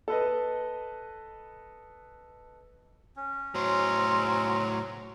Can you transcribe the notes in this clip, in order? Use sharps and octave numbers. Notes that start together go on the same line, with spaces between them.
A4 B4 D#5
C#4
A2 F#3 C5 C6